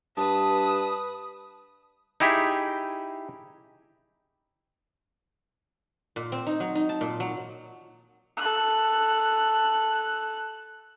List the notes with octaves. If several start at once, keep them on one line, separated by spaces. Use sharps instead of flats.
G2 B4 A5 D#6
D#4 E4 G4 G#4 E5
A#2
C4
D#4
F#3
D#4
A5
A#2
F#3
A4 F#6